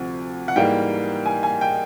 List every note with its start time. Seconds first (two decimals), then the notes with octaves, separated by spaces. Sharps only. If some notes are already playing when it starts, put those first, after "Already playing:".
Already playing: D2 C3 F3
0.48 F#5
0.56 G#2 E3 G3 A#3 G5
1.26 G#5
1.43 G#5
1.61 G5